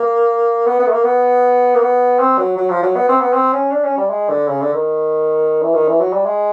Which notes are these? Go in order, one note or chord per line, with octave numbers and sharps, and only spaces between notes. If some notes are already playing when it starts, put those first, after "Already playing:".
Already playing: A#3
B3
B3
A3
A#3
B3
A#3
B3
C4
F#3
F#3
F3
F#3
B3
C4
B3
C4
C#4
D4
C#4
G3
G#3
D3
C#3
D3
D#3
E3
D#3
E3
F#3
G3
G#3